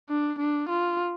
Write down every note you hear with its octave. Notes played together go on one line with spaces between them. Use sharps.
D4
D4
F4